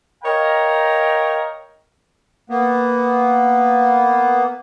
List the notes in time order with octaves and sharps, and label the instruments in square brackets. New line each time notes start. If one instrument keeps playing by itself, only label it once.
[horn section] A#4 C#5 D#5 F5 G5 A#5
[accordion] A#3 B3